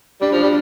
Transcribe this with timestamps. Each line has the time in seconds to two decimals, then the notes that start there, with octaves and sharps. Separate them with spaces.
0.21 G3 D4
0.32 F3
0.37 D4
0.43 G3